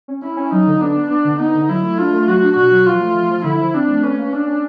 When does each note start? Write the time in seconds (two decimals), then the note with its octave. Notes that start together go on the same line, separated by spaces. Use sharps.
0.08 C#4
0.22 C#4 E4
0.37 C#4
0.51 F#3 D#4
0.67 D3
0.81 B3 D4
0.95 B3
1.10 B3 D4
1.25 D3
1.39 B3 D#4
1.55 D3
1.69 F#3 E4
1.83 A3
1.98 D4 F4
2.13 A3
2.28 F#3 F#4
2.42 D4
2.56 B2 F#4
2.71 F#3
2.86 F3 F4
3.01 A3
3.15 F3
3.31 F3
3.44 D3 E4
3.59 F3
3.74 C4 D4
3.89 A3
4.03 C#4 B4
4.18 A#3
4.32 C#4 D4
4.47 C#4